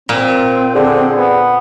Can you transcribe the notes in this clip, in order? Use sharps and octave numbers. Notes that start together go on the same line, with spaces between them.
A#2 C4
D3 G#4
B3